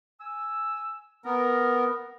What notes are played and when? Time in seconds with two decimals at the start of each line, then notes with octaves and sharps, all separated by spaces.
0.20 G#5 E6
1.25 B3 A#4